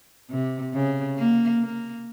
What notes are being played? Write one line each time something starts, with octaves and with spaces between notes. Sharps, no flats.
C3
C#3
A#3
A#3